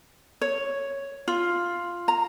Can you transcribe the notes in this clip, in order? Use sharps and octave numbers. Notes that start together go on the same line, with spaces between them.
C#5
F4
A#5